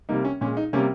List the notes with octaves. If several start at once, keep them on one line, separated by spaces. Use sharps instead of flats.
C3 G3 A#3 D#4
C#4
A#2 G#3 C#4
D#4
C3 G3 A#3 C#4